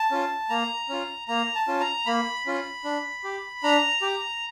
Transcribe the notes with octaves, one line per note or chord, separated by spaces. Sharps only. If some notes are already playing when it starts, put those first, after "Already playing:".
Already playing: A5
C#4 F4
A#3 A#5
C#4 F4
A#3 A#5
A5
C#4 F4
A#5
A#3 B5
C#4 F4
D4
G4
D4 A#5
G4